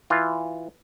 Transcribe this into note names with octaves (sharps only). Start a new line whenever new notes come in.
E3 F4